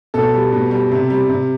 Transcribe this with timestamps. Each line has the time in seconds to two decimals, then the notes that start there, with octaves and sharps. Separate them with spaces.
0.14 B2 A4
0.34 G3
0.53 B2
0.71 G3
0.91 C3
1.10 G3
1.29 C3